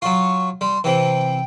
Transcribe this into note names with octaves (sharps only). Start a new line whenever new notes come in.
F#3 F4 C#6
G3 C6
C3 E3 G5